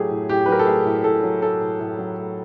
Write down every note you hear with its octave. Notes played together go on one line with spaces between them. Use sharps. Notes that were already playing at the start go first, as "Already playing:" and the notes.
Already playing: A2 F#3 A3 G4 G#4
A2
A2 G4
B4
F#3 A#4
A4
A3 G#4
A2
A2 A4
F#3
A3 A4
A2
A2
F#3
A3